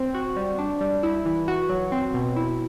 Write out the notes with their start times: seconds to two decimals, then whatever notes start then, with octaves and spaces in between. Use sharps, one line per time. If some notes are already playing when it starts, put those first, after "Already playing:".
Already playing: C4
0.14 F#4
0.36 G3
0.59 D4
0.81 G3
1.03 E4
1.25 E3
1.48 F#4
1.69 F#3
1.92 C4
2.14 B2
2.36 E4